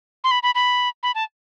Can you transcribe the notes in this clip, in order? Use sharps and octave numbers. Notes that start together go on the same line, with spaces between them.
C6
B5
B5
B5
B5
A5